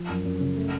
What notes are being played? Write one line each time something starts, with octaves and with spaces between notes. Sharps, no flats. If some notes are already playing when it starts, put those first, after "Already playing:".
Already playing: F3
F#2
F#2
C#3
A3